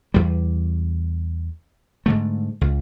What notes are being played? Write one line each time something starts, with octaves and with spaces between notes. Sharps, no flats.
E2 G3
G#2 D3 A3
C#2